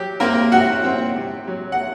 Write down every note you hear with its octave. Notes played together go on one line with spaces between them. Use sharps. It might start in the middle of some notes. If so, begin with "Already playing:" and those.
Already playing: F#3 G4
A#3 C4 A#4
C3 F#4 F#5
C4
C3
F#3
F#5